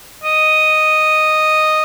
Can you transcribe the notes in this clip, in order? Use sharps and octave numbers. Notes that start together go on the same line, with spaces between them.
D#5